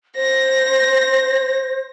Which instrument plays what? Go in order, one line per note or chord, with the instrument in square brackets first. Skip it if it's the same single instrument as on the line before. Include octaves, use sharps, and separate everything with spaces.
[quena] C5 [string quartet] A#6